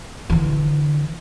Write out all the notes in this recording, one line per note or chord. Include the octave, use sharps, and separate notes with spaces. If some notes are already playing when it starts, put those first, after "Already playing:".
D3 E3